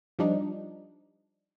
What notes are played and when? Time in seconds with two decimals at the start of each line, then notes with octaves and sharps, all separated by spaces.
0.19 F3 G3 D4 D#4